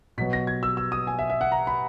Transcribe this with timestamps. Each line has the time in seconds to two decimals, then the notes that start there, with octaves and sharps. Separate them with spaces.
0.18 B2 F#3 B3 B6
0.33 A#6
0.47 G#6
0.63 E6
0.77 E6
0.92 D#6
1.07 G#5
1.19 E5
1.30 E5
1.41 F#5
1.52 A#5
1.67 B5